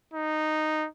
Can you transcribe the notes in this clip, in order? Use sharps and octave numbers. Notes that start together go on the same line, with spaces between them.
D#4